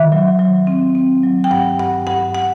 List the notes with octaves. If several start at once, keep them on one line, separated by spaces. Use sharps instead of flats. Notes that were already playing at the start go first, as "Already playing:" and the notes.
Already playing: D#3 E5
F#3
F#3
C4
C4
F#3
G5
G2 F#5
G2 F#5
G2 F#5
F#5